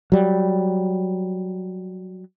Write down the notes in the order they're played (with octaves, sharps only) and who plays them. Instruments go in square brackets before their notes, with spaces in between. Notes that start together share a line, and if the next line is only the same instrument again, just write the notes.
[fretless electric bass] F#3 G3